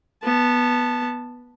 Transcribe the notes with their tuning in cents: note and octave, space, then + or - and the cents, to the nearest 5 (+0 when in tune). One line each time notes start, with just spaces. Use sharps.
B3 -10 A5 +0